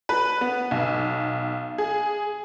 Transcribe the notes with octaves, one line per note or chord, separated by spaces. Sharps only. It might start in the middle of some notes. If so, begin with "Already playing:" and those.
B4
B3
B1
G#4